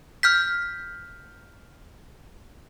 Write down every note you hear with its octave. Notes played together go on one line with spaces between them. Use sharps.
F6 G6 B6